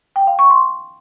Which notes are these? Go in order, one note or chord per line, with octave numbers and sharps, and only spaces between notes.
G5
F5
C#6
C6